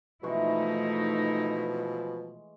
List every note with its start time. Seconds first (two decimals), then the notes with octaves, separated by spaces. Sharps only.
0.23 B2 E3 F3 G#3 A3 D#4 E4 C#6